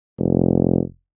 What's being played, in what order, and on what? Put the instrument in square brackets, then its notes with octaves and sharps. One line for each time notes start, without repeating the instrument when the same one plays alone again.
[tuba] F1